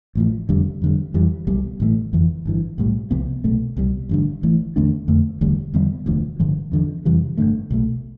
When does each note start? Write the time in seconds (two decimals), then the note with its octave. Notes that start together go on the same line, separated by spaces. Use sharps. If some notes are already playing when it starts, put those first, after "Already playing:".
0.15 A1 A2 F3
0.49 F1 F2 D3 G3
0.82 F2 D3 G3
1.14 F2 E3 G3
1.47 B1 B2 G3
1.80 A1 A2 E3 A3
2.13 G1 F2 E3
2.45 G1 G2 E3
2.78 B1 A2 G3
3.11 C2 C3 F3 B3
3.44 B1 B2 A3
3.77 C2 B2 G3
4.09 A1 G2 D3
4.43 A1 A2 E3
4.76 E2 D3 A3 D4
5.08 F2 D3 A3
5.41 E1 D2 D3 G3
5.74 E2 D3 G3 B3
6.06 E1 D2 D3 F3
6.39 G1 G2 D3 F3
6.72 E2 D3 F3
7.05 F2 C3 E3 G3
7.37 G1 F2 D3 A3
7.71 B1 B2 A3